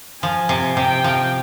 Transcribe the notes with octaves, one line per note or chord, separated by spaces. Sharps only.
F3 G#5
C3
C3 G5
F3